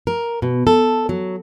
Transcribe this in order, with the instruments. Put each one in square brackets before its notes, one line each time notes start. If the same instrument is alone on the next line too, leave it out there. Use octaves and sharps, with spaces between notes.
[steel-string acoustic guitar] A#4
B2
A4
F#3